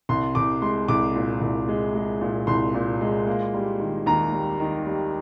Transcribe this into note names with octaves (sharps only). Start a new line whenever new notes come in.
C2 C6
C2 D6
G#3 C6
C2 D6
A#2
C2
G#3
G#3
A#2
C2 C6
A#2
G#3
A#3
G3
D#3
D#2 A#5
G3
D#3
G3